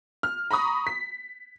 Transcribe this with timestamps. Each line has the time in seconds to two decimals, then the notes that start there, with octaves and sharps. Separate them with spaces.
0.23 F6
0.51 A#5 B5 C#6 D#6
0.87 B6